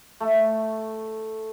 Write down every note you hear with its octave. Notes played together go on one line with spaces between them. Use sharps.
A3